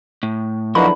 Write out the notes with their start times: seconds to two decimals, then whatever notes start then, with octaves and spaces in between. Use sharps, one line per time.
0.23 A2
0.75 E2 D3 F3 F#3 A#3 D#4 F#4 B5